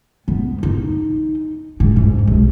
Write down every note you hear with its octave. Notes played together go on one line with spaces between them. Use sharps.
B3
D#4
G#2
G#2
C2